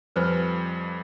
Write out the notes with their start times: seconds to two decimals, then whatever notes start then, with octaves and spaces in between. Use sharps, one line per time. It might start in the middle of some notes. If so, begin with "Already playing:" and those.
0.16 F2 F3 G3 B4 C5 G#5